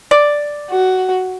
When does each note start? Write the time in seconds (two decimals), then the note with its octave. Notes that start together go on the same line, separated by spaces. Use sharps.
0.11 D5
0.70 F#4